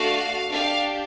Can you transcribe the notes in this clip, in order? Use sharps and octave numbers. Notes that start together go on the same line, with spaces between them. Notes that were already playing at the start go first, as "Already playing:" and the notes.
Already playing: A3 D4 F#4 F5
D4 G4 F5